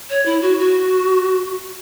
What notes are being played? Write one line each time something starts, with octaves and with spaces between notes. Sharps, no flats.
C#5
E4
F#4
F#4